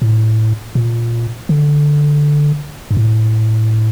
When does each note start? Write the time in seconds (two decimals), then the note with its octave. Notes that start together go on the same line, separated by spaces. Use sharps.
0.02 A2
0.75 A#2
1.49 D3
2.91 G2
2.97 A2